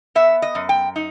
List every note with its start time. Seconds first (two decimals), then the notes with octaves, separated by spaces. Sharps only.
0.15 B3 E5
0.42 D#5
0.55 F#2
0.69 G5
0.96 D#4